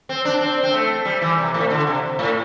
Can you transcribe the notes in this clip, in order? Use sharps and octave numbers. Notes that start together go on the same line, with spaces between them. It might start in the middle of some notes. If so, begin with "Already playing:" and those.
C4
D4
C4
C4
A3
G3
E3
C3
A2
D3
C3
A2